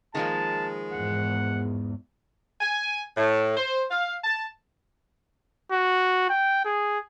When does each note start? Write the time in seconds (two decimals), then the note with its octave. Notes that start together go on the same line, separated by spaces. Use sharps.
0.15 D#3 F3 G#3 A#3 A5
0.93 E2 G#2 F#5
2.61 G#5
3.17 A2
3.57 C5
3.90 F5
4.24 A5
5.72 F#4
6.30 G5
6.65 G#4